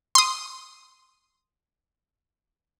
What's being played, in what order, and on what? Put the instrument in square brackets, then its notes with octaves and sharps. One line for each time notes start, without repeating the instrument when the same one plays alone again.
[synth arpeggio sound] C6 D#6